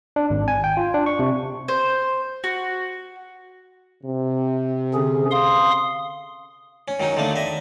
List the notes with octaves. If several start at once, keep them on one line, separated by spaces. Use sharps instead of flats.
D4
G#1
G#5
G5
F4
D4
C#6
C3
C5
F#4
C3
D3 C#4 G#4
F5 C6 D#6
C#4
D#3 F#3 C#4 D#4
D3 D#3 A3 A#3
D#5 E5